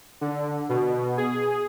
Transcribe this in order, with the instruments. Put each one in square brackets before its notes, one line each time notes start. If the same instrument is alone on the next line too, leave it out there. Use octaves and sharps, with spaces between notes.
[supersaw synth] D3
B2
G#4